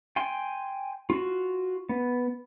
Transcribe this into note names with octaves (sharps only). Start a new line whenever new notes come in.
G5 G#5 C6
F4 F#4
B3